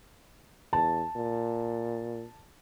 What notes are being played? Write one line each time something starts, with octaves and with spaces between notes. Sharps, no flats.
E2 A5
A#2